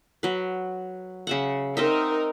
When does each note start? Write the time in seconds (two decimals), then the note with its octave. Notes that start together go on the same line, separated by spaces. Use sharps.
0.23 F#3 B4
1.27 C#3 E5 F#5
1.77 C4 D#4 A#4 D#5 E5